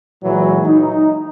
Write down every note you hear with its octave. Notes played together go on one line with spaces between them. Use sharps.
A#2 E3 F#3 G#3
D#4